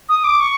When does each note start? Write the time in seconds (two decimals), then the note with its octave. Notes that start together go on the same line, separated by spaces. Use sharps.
0.09 D#6
0.24 D6
0.40 C#6